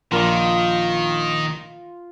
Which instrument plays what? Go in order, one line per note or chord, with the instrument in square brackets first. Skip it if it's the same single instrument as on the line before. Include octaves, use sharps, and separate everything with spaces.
[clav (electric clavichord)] A#1 A#4 D5 [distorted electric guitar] D#3 [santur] F4 F5 C6